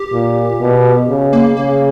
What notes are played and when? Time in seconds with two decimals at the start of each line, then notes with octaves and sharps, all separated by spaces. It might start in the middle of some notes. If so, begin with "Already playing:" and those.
Already playing: G4
0.12 A#2
0.60 B2
1.08 C#3
1.33 A#3
1.57 C#3 A#3